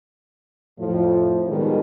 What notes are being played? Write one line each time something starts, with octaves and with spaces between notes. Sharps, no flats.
F2 A2 F3
B2 D#3 G3 G#3 A4